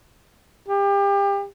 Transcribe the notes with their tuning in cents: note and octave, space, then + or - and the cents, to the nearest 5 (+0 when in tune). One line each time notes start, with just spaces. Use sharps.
G4 +30